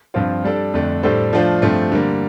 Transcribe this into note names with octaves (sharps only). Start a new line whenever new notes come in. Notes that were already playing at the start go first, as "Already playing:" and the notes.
G2 F3 C4 F4
G3 D4 A4
F2 D3 A3 D4
A2 G3 D4 A4 C5
F3 A3 D4 F4 C5
G2 F3 A3 C4
D3 G3 A#3